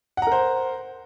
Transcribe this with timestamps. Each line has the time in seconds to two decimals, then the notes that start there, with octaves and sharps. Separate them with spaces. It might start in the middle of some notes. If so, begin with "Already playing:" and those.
0.17 F#5
0.22 A#5
0.27 A#4
0.32 C5